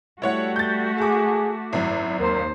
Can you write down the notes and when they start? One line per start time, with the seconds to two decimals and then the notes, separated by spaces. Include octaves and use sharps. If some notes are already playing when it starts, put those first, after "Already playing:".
0.22 G3 A3 E4 F#4 C#5 F#5
0.56 G6 A6
0.98 G#4 A5 D6
1.73 G#1 F#2 E4
2.20 D#2 A#4 C5